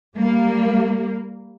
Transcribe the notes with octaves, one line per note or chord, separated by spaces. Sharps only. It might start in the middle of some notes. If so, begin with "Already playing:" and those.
G3 A#3